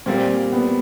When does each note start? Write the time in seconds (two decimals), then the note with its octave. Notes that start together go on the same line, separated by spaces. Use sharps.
0.06 A#2 G3 A#3 C4
0.52 B3